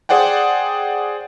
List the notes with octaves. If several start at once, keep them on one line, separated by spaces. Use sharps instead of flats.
G#4 C5 D5 F#5 G5